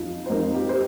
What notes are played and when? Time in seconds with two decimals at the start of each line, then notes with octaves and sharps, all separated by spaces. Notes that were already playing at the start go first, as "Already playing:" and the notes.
Already playing: F2 F3 D#4
0.26 C5
0.30 F2 F3 D#4 A#4
0.54 G4
0.69 C5